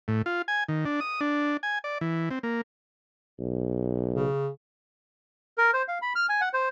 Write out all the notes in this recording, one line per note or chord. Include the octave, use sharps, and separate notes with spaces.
A2
F4
G#5
D#3
D4
D#6
D4
G#5
D5
E3
C4
A#3
B1
C#3
A#4
C5
F5
B5
F6
G#5
F#5
C5